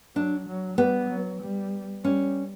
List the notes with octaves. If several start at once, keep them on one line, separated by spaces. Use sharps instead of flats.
F#3 D4
F#3
G3 B3
F#3
G3
G3 C#4